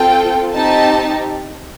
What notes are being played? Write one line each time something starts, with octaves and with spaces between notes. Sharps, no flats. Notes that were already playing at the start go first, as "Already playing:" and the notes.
Already playing: C4 F4 A4 G5
C4 D#4 G4 A5